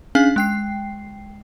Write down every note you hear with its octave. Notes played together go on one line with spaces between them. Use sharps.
C#4 D4 G#4 F5 G#5
G#3 G5 C7